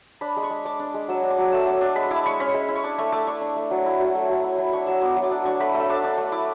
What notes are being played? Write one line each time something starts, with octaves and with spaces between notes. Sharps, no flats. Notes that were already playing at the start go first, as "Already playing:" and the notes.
D4 B5
G#3 B5
C#6
G#3
D4 D6
D4
G#3
F#3 E6
D4
D6
F#3
A3 E6
F#3 D6
D4
G#3 B5
E4 D6
G#3 C#6
C#4 B5
G#3
E4
C#6
D4 D6
A3 C#6
A3 D6
D4 C#6
D4
A3
F#3
E4
F#3
A3
F#3
E4
F#3 B5
D4 C#6
F#3 E6
B3 D6
F#3
D6
D4
D4 C#6
A3 B5
A3
E6
D4 D6
D4
A3
E4 D6